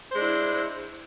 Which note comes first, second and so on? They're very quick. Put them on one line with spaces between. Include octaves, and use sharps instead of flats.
C5 G#3 D4 E4